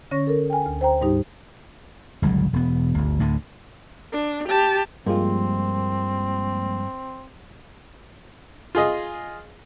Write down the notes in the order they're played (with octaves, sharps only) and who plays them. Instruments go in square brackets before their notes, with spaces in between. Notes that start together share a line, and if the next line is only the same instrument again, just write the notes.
[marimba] D3 C#4 C#5 C#6 A#6
A4 A#4
G5 G#5
D2
C5 G5 A#5
G#2 G3 D#4 G4
[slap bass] G1 C#2 A#2 F#3
E1 B3
G1 D2
D2 A2 D3
[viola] D4
G4 A5
[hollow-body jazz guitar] G2 [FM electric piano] F3 G#3 A#3 [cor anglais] C4
[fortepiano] F4 G#4 D#5